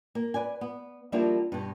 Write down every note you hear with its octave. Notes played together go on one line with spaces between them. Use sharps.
A#3
B4 D5 G#5
B3
F3 G3 A#3 D4 E4 F#4
G2 B2